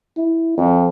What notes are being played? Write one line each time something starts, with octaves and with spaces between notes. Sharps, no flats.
E4
F2